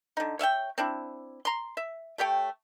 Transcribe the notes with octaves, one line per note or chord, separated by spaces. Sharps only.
D3 D#4
C#5 E5 F5 G5
C4 D4 E4
A#5 C6
E5
A3 G4 C#5 G5